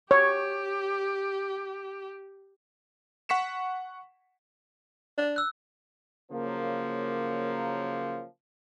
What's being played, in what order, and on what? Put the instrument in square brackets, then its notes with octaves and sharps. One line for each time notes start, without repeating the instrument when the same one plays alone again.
[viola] G4 [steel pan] C#5
[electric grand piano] F#5 C#6 B6 C#7 E7
[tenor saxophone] D4
[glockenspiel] E6 F#6
[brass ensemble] C#3 F3 F#3 A#3